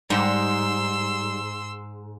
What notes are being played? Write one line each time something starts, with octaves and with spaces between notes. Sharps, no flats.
G#2 G3 C6 E6